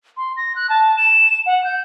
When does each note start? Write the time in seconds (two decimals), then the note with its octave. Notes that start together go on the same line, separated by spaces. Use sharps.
0.17 C6
0.37 A#6
0.56 F#6
0.69 A5
0.97 E7
1.46 F#5
1.64 G6